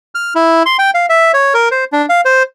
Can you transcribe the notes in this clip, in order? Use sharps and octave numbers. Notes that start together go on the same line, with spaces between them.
F6
E4
C6
G5
F5
E5
C#5
A#4
C5
D4
F5
C5